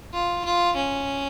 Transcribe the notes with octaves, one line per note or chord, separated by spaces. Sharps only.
F4
F4
C#4